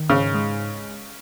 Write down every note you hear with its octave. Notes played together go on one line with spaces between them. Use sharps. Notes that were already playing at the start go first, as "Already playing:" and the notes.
Already playing: D#3
G#2 C#3
G#3